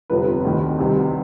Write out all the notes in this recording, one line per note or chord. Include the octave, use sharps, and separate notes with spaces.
G1 F2 C3 F3 B4
D2 C3 D#3
C2 C3 D#3